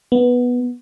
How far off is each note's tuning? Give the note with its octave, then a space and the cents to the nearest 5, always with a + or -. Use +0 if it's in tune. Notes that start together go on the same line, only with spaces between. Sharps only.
B3 -5